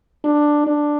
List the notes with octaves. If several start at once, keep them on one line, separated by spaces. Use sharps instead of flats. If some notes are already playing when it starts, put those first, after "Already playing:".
D4
D4